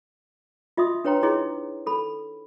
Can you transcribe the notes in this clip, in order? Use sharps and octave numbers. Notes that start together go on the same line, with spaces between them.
F4 D#5 E5 C6 D#6
D4 B4 C#5 G5 A#5 C6
D#4 E4 G#4 C#5 D#5 C6
A4 B5